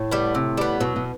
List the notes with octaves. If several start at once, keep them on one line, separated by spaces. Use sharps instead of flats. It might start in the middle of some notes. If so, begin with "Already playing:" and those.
Already playing: A2
G3 B3
C3
G3 B3
B2 F#3
B2